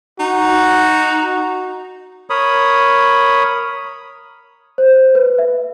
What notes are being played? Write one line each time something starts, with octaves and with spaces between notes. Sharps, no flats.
D#4 F#4
A#4 C#5 B5 D#6
C5
B4
E5